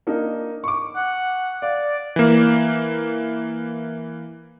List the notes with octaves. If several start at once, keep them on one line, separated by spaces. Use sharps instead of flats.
A#3 D4 D#4
C#6 D6
F#5
D5 F5
E3 A#3